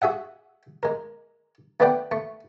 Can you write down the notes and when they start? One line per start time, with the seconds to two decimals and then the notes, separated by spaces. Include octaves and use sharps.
0.02 F#4 G#4 E5 F#5
0.83 G#3 A#4
1.80 A3 B3 B4 D5 F#5 G5
2.11 A3 C#6